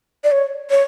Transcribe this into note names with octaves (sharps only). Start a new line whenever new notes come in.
D5
C#5
C#5